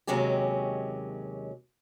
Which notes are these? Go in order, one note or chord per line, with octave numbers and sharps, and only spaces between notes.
D#2 C3 F#3 G#3 C#4 G4